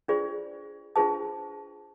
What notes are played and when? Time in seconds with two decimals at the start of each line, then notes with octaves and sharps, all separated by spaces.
0.08 D4 F4 G#4 C5 D5
0.96 D4 F4 G#4 C5 A5